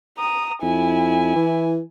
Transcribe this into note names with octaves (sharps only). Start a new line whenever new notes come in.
A#5 D#6
F2 E4 G#5
E3